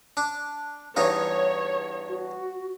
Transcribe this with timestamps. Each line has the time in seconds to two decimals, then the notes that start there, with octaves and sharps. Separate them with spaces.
0.17 D4
0.97 E2 G2 D#4 C#5
2.09 F#4